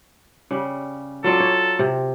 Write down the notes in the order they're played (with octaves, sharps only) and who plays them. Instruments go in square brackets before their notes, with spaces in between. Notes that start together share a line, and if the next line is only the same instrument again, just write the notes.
[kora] C#3 G3
[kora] F#3 F4 D5 [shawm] A4
[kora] C#5
C3